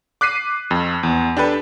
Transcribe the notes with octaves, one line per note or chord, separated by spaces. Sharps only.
D6 F#6 B6 C7 D#7
F2
E2
D4 G4 A4 B4